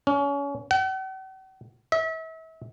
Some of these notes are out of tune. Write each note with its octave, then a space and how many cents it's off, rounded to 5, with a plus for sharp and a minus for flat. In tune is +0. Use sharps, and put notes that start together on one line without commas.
C#4 +30
F#5 +45
E5 -35